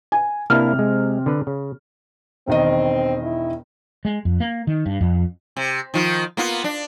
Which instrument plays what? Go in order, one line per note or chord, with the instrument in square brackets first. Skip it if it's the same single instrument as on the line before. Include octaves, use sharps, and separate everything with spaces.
[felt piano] G#5
[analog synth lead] C3 [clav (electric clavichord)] A#3 D4 E4 [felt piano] F6
[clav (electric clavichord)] G#3
D3 B4
C#3
[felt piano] E1 D#3 D#5 [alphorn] C4
[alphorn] E4
[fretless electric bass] G#3
F2
A#3
D#3
G2
F2
[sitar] C3
D#3 F3 F4
A#3 B3 F4
D4